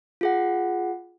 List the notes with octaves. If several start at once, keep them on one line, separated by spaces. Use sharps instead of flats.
F4 G#4 F#5